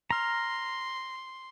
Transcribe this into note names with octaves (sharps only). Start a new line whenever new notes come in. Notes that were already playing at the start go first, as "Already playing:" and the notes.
A#5 C6 F6